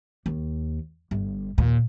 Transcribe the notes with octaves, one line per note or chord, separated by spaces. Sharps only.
D#2
G1
D#2 A#2